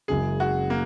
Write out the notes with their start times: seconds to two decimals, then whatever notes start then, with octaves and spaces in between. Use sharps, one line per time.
0.08 F#1 F#2 C#3 G#3 G#4
0.40 F#4
0.70 A#3